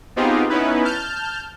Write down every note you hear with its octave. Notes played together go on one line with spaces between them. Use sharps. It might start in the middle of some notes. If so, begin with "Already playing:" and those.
B3 C4 D#4 F4 G4 G#4
B3 C#4 D#4 E4 B4
A5 F6 G6